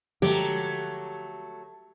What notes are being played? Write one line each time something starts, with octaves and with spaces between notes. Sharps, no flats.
D3 F3 F#3 G#3 A3 G4